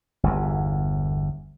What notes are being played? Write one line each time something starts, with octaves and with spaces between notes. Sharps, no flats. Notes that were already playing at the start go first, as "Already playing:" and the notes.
G1 E2